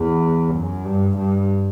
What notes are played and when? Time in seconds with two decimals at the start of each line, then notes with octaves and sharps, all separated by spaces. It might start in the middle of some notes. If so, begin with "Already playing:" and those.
Already playing: E2
0.55 F#2
0.86 G2
1.18 G2